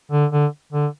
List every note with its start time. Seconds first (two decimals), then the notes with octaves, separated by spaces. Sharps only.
0.11 D3
0.32 D3
0.72 D3